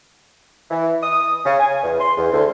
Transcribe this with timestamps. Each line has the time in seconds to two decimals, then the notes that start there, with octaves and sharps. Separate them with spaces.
0.71 E3
1.02 D#6
1.45 C#3
1.60 G#5
1.83 E2
2.00 C6
2.18 E2
2.32 D2